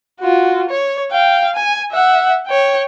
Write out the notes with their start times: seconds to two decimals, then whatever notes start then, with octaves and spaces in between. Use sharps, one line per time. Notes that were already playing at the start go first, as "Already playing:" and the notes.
0.20 F4 F#4
0.69 C#5
1.11 F5 G5
1.55 G#5
1.92 E5 F#5
2.46 C#5 G5